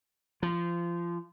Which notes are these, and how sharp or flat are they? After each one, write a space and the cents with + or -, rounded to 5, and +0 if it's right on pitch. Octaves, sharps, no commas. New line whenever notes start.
F3 -25